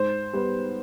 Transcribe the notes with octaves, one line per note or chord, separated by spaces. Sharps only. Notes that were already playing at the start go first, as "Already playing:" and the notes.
Already playing: G#2 C5
G3 B3